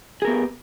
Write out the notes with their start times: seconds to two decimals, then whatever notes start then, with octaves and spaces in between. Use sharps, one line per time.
0.22 G#4
0.25 A#4
0.27 B3
0.30 G4